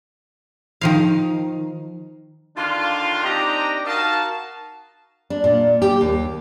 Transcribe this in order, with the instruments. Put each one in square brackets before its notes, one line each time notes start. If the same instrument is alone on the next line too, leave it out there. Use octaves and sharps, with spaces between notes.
[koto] D#3 F3 F5
[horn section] D3 D#3 D4 F4
C4 D4 D#4 G4 D#5 A#5
D#4 F#4 A#4 F5 A5
[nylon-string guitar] D4
A#2
G4
D#2